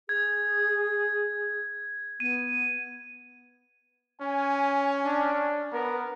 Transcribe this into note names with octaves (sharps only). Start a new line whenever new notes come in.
G#4 G#6
B3 D#7
C#4 G#5
D4
B3 A#4